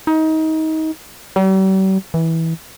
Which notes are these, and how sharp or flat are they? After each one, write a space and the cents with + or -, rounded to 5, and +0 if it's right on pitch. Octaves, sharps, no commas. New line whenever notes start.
D#4 +25
G3 -45
E3 -15